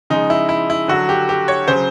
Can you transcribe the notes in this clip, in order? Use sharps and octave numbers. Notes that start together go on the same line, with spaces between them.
C#3 F3 G#3 D#4
E4
E4
E4
D3 F#3 F#4
G4
G4
C#5
C#3 F#3 C5